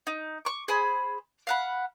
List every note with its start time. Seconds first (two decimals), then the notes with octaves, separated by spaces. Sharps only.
0.07 D#4
0.45 C#6 D6
0.68 G#4 C5 B5
1.47 F5 F#5 B5